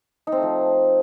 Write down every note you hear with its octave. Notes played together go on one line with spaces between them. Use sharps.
D#4
C4
A3
F3